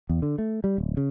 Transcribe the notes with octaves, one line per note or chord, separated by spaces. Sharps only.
E2
D3
A3
G3
D1
C#3